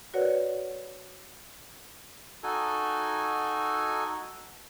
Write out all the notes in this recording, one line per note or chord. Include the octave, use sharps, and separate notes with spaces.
F#4 A#4 B4 C#5 D5 F#5
D#4 F#4 A4 G#5